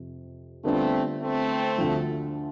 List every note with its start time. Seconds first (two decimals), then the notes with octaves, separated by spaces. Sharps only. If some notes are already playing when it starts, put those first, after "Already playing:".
Already playing: F2 C3
0.64 D3 G3 A3 B3 C4 D4 F4
1.20 A3 C4
1.78 D2 D3 F3